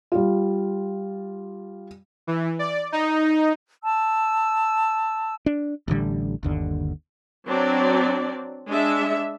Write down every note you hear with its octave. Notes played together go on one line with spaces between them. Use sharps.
G3 F4
E3
D5
D#4
A5 E6
D4
A1 A2 D3 G3
G1 D#2 D3
F#3 C4 D4 D5
G#3 D4 E5